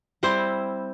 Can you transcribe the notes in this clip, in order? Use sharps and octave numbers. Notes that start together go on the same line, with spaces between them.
G3 C4 E4 C5